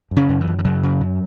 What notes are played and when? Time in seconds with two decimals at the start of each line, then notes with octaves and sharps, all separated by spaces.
0.11 F#2
0.16 C#3 C#4
0.29 F#2
0.41 E3
0.47 F#2
0.59 E3
0.65 F#2 C#3 F#3
0.83 C#3
1.01 F#2